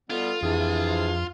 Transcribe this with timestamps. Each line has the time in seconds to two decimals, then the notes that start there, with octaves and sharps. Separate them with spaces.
0.10 B2 G3 B3 F4 A4
0.42 F2 C3 E3 D4 G#4